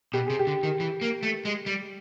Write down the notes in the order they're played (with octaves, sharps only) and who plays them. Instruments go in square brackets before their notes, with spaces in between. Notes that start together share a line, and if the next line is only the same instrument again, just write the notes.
[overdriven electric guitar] B2 [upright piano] G4
[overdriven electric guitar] C3 [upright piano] G#4
[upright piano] G4
[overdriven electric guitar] D3
D#3
E3
A#3
A3
G#3
G3